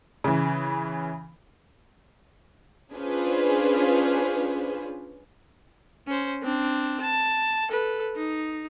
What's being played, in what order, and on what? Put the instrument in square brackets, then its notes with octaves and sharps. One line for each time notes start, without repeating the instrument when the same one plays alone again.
[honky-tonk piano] C#3 E3
[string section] C#4 D4 F4 G#4 B4 C5
[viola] C#4 C5
C4 D4
A5
A4 B4
D#4